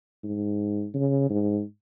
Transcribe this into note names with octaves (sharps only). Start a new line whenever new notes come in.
G#2
C#3
G#2